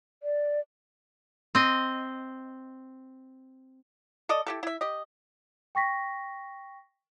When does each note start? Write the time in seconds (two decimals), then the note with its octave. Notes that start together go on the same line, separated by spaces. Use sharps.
0.23 D5
1.55 C4 D#5
4.29 A4 D5 D#5
4.47 E4 G4 A4
4.63 E4 E5
4.81 G4 D#5
5.75 G5 C#6 A#6 B6